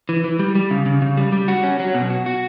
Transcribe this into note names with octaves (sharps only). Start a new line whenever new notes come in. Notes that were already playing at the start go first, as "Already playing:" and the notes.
E3
E3
G3
G3
C#3
C#3
C#3
G3
G3
F#4
C#4
F#3
B2
F#4
F#4